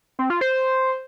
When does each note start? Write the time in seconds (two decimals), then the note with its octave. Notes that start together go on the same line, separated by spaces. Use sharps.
0.19 C4
0.30 F4
0.41 C5